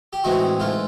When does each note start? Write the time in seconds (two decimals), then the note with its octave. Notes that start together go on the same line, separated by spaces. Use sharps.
0.13 G4
0.24 A2 E3 G#3 C4 D#4 F#4
0.60 G#2 E3 A3 F4